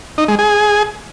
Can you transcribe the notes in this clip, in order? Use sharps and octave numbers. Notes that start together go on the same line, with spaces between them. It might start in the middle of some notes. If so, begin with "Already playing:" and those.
D#4
G#3
G#4